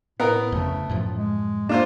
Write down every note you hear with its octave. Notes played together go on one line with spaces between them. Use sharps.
A2 B3 A#4
F2 C#3 A3
F#2 A2 F3
G#3
A#3 D4 F4 C5